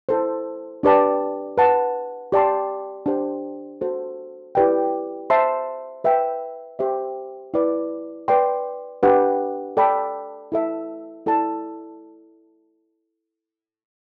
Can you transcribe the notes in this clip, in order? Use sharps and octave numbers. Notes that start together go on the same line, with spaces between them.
E4 A4 C5
D4 G4 B4 D5 A5
B4 F#5 A5
G4 D5 A5 C6
D4 G4 C5
F#4 A4 C5
E4 G4 B4 D5 G5
C5 E5 A5 C6
B4 E5 G5
G4 C5 E5
E4 B4 D5
B4 D5 G5 C6
D4 G4 B4 F#5
A4 D5 G5 B5
E4 A4 E5
E4 A4 D5 A5